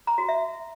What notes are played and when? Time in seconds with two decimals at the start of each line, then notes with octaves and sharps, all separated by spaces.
0.07 A#5
0.18 F#4
0.29 E5